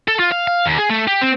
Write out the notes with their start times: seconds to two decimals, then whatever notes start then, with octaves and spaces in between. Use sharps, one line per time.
0.08 A4
0.19 F4
0.32 F5
0.47 F5
0.66 D#2
0.78 G#4
0.89 A3
1.07 G4
1.21 C4